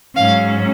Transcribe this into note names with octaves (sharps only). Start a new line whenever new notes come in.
G#2 F#3 C#4 F5